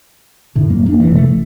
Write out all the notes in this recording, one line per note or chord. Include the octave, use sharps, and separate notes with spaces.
F#2 A2 D3
F2 F#3 A#3
A#3 D4
F1 F2 E3
C3 F3 A3
A1